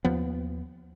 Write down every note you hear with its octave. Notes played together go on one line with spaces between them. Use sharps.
D#2 F3 B3